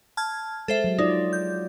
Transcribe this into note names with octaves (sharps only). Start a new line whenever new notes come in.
A5 F6 G#6
G#3 A4 C5 E5
F#3
D#4 F4 D5
G6